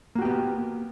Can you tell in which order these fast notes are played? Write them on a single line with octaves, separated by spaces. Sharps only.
A#3 F#4 G4 B3